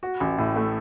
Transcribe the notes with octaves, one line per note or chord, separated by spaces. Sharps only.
F#4
A1
A2
A3